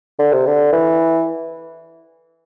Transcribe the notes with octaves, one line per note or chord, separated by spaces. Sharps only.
D3
C3
D3
E3